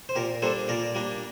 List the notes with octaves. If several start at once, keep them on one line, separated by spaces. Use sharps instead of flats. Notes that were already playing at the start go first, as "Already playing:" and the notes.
C5
A#2 G4 A#4
G3 A#3 D4 A4 C5
A#2 A#4 D5
G3 A#3 D4